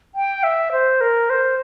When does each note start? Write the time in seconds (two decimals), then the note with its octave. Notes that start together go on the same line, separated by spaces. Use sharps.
0.15 G5
0.43 E5
0.72 C5
1.01 A#4
1.30 C5